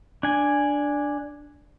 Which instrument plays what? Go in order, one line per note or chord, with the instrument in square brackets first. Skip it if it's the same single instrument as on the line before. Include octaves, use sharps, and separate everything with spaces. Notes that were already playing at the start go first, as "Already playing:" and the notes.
[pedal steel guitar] D4 G#5